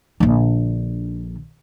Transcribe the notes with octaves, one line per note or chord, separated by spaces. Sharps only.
A#1 D3